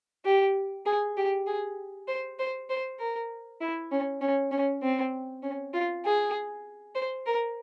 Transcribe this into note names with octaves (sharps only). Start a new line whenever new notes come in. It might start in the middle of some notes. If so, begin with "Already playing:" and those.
G4
G#4
G4
G#4
C5
C5
C5
A#4
E4
C#4
C#4
C#4
C4
C#4
F4
G#4
C5
A#4